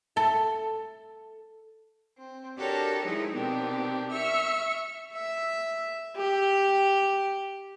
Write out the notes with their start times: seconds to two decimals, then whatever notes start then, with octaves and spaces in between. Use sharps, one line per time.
0.16 A4 E5
2.18 C4
2.59 D4 F#4 G4 A4 A#4 C#5
3.05 D#3 F3 G#3 D#4 E4 G#4
3.34 B2 D#3 B3 C4 D4 G4
4.12 E5 C#6 F6
5.13 E5
6.16 G4